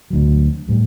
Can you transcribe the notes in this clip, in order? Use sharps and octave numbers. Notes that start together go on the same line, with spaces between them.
D2 F#3
A2 G3